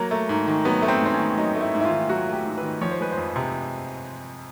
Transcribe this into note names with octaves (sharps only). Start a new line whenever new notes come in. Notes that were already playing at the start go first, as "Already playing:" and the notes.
Already playing: F#3 A#3
A3
G#2
D#3
F#3 B3
A3
C4
G#2 C4
C#4
D#3
F#3 D#4
A3
E4
G#2
E4
F4
D#3
F#3 F#4
A3 G4
G#2
B4
D#3
F3 C#5
C5
G#3 B4
C5
F2
C3